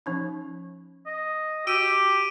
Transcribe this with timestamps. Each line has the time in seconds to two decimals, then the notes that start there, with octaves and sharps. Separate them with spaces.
0.06 F3 C#4 D#4
1.07 D#5
1.67 F#4 G4 E6 D7 D#7